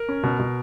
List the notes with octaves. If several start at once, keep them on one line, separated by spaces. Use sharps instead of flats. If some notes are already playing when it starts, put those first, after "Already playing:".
Already playing: A#4
C#4
B2
B2